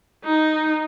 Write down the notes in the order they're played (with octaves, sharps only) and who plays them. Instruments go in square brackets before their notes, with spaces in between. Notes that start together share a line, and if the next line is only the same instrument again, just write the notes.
[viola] D#4